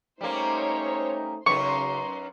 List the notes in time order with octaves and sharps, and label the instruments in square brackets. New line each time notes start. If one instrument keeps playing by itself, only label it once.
[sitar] G3 A#3 [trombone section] A3 C#4 D#4 [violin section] C5 C#5
[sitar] F#2 B3 D#4 [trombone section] C#3 [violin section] C6 [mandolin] C#6